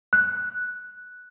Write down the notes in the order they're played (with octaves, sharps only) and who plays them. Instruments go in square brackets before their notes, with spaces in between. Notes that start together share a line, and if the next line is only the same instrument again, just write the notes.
[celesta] F#6